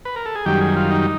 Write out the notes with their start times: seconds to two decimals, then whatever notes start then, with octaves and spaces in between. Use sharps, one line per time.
0.05 B4
0.16 A#4
0.26 A4
0.35 G#4
0.45 F#2 D#3 G3 G4
0.61 G#4
0.76 F4
0.91 D#4